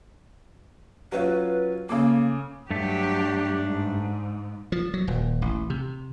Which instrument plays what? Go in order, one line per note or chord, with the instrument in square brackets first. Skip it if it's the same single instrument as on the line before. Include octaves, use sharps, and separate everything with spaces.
[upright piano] F#3 C#4 F4 [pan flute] B4
[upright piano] C#3 A4 D6 [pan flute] A#3
[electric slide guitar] G2 A3 [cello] F#3 G4 [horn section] D4
[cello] G#2
[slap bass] F3
F#3
D#1
A1
C3